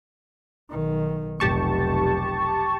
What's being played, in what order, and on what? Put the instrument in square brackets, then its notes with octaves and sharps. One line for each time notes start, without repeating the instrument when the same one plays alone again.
[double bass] B1 D#3
[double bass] F1 B1 [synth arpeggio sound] G4 A5 C#6